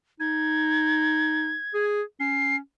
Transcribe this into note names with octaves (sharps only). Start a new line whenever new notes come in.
D#4 G#6
G#4
C#4 C7